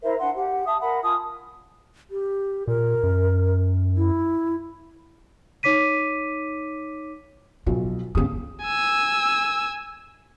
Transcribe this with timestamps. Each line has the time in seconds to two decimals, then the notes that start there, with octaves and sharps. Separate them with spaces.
0.01 E4 A#4 C5 E5
0.19 D4 F#5 C6
0.34 G4 F#5
0.65 E5 A5 D#6
0.79 A#4 F#5 B5
1.02 F4 G#5 A5 D#6
2.11 G4
2.67 A#2 A#4
3.03 F#2
3.97 E4
5.63 D#4 C#5 D6 B6 D#7
7.66 B1 B2 F3 F4
8.15 G2 C#3 B3 G4 D#6
8.64 G#5 E6